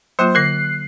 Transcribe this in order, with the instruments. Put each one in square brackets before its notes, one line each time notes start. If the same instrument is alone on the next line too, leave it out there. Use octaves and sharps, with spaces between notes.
[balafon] F#3 A#3 F4 [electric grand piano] C5
[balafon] D3 A#4 [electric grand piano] F#6 C7